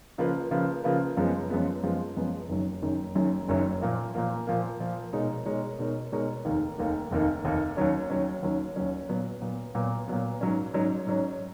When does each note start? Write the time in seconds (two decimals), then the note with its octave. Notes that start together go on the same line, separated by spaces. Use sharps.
0.18 C#3 F3 A#3 F4 B4
0.51 C#3 F3 A#3 F4 B4
0.84 C#3 F3 A#3 F4 B4
1.17 F#2 F3 G#3 B3
1.50 F#2 F3 G#3 B3
1.83 F#2 F3 G#3 B3
2.16 F#2 F3 G#3 B3
2.49 F#1 F#2 D#3 F#3
2.82 F#1 F#2 D#3 F#3
3.15 F#1 F#2 D#3 F#3
3.48 F#1 F#2 D#3 F#3
3.81 A#2 F3 A#3
4.15 A#2 F3 A#3
4.47 A#2 F3 A#3
4.80 A#2 F3 A#3
5.13 B2 G#3 D#4 A#4 C#5
5.46 B2 G#3 D#4 A#4 C#5
5.79 B2 G#3 D#4 A#4 C#5
6.12 B2 G#3 D#4 A#4 C#5
6.45 F1 D#2 D#3 A#3
6.78 F1 D#2 D#3 A#3
7.11 F1 D#2 D#3 A#3
7.44 F1 D#2 D#3 A#3
7.77 D#2 D#3 F#3 C#4
8.09 D#2 D#3 F#3 C#4
8.43 D#2 D#3 F#3 C#4
8.76 D#2 D#3 F#3 C#4
9.09 A#2 F#3 B3
9.41 A#2 F#3 B3
9.75 A#2 F#3 B3
10.08 A#2 F#3 B3
10.41 G#2 F#3 C#4
10.73 G#2 F#3 C#4
11.07 G#2 F#3 C#4